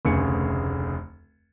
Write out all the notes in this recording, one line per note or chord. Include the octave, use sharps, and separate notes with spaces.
F1 D2 C#3 G#4 C#7